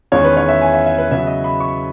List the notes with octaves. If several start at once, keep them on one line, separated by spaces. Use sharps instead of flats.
E2 D#3 G#3 C#4 C#5
B4
C#5
E5
G#5
E5
E5
B4
C#3 F#3 B3 E5
D#5
B5
C#6